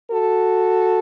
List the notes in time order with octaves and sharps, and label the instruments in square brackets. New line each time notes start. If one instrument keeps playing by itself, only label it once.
[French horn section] F#4 A4